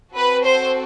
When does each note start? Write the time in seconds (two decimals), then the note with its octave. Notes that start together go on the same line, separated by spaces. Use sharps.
0.14 C4 F#4 A4 B4
0.44 C5